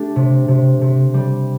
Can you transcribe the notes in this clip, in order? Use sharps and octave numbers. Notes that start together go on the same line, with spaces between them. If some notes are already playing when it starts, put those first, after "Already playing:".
Already playing: A3 D4 G4
C3
C3
C3
G3